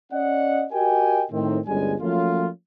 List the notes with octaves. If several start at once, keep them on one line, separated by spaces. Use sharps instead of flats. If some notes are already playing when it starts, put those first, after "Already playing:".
C#4 D5 D#5 F#5
F#4 G4 A#4 D#5 G5 G#5
A2 D#3 C4
G1 D2 G3 G#3 C#4 G#5
F3 F#3 A3 A#3 C#4 F4